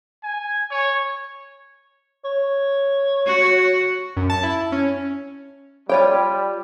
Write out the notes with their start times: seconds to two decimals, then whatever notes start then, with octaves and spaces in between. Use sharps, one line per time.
0.23 G#5
0.71 C#5
2.25 C#5
3.26 F#4
4.17 F#2
4.30 A5
4.43 E4
4.72 C#4
5.89 G3 F4 C#5 G5